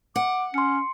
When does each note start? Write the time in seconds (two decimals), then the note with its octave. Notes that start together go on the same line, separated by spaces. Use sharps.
0.16 F#5 D6
0.54 C#4 C6 C#7